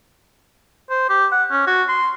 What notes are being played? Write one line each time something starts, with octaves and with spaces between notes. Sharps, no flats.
C5
G4
F#5
C#4
F#4
C6